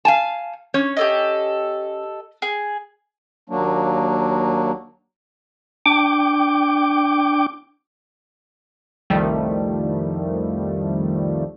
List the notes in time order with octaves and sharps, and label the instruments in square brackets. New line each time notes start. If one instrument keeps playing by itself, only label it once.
[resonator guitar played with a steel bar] F5 G#5 A5
C#4 C#5
[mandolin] G4 A4 D#5
G#4
[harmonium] D#2 F#3 A#3 D4
[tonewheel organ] D4 G5 D6
[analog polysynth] C2 F2 D#3 F3 G3 A3